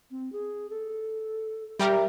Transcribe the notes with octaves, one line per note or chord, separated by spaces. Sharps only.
C4
G#4
A4
G3 G4 A#4 E5